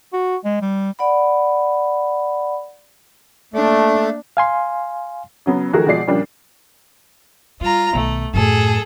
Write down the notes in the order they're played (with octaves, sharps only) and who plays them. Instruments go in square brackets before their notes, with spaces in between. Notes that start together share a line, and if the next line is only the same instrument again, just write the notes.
[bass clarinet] F#4
G#3
G3
[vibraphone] D5 F#5 B5
[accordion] A3 [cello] A#3 D4
[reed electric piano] F5 G#5 C6
[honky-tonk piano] C#3 F#3 B3
D#3 F3 A3 F#4 G#4 A#4
B2 F3 G#3 D5 C7
A#2 C#3 F3 G3 D4
[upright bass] G3 [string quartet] F4 A#5
[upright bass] B1 D#3 [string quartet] A3
[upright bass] F#2 A2 [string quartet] G#4 A4